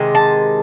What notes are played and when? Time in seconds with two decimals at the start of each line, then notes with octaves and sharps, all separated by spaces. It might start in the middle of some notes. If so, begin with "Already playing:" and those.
Already playing: C3 D#3 G#3
0.15 A5